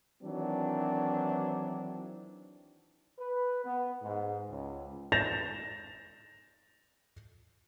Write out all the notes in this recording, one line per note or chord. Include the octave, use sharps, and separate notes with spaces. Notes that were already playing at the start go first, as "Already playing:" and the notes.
D#3 E3 F#3 C4 D4
B4
B3
G#2
C#2
G6 A6 A#6 E7 F7